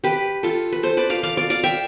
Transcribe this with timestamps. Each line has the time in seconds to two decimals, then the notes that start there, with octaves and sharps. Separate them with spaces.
0.04 G4 B4
0.43 F4 A4
0.72 B4
0.83 A4 C5
0.97 B4 D5
1.10 D5 F5
1.23 D5 F5
1.37 D5 F5
1.50 D5 F5
1.64 E5 G5